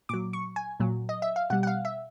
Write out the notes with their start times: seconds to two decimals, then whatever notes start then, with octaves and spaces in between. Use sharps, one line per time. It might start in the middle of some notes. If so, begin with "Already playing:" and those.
0.09 A#2 F#3 D6
0.33 C#6
0.56 G#5
0.80 A#2 F#3
1.09 D#5
1.22 E5
1.36 F5
1.50 B2 G3 F#5
1.63 F#5
1.67 F5
1.85 E5